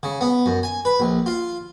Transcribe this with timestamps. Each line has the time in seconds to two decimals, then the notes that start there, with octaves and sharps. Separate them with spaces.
0.03 C#3
0.21 B3
0.46 F#2
0.63 G#5
0.85 B4
1.00 A#1
1.26 F4